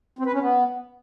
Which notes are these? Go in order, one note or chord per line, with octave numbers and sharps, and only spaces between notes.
C4
B4
C#4
B3